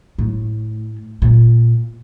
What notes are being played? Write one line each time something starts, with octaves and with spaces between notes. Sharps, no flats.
A2
A#2